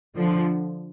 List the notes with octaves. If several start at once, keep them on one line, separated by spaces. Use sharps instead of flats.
D3 F3